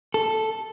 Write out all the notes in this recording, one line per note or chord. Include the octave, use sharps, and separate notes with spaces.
A4